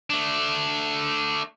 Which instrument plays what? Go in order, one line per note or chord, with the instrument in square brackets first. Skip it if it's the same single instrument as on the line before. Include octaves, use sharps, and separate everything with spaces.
[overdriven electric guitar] A3 D4